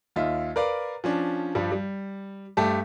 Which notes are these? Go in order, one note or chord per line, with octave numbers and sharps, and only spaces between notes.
D#2 F4 D#5 E5
A#4 B4 D5 F5
F3 C#4 D4
G2 F3 G3
G3
G2 A3 D4 G4 A5